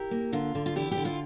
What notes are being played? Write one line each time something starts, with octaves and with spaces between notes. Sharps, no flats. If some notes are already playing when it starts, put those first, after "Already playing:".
Already playing: E4 G4 A#4
A#3
D3 F4
D3
F4
E2 E4 G4
G4
D3
F4